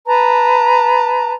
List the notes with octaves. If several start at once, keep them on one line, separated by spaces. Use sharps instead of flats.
B4 A5 A#5